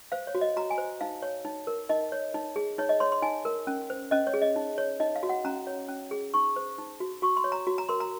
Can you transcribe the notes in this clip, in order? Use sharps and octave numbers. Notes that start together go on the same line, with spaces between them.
C5 F5
C#5
F#4
D#5
F#4 A#5
G#5
C5
D#4 F5
C#5
D#4
A#4
D#4 D#5
C#5
D#4
G#4
D#4 C#5
D#5
C#5 C6
C6
D#4 G#5
A#4
C#4
C5
C#4 D#5
C#5
G#4
D#5
D#4
C#5
D#4 D#5
F5
F#4
F#5
C#4 A#5
C#5
C#4
G#4
D#4 C#6
C5
D#4
F#4
F#4 C#6
C6
C#5
A#5
F#4
A#5
A#4 C6
A#5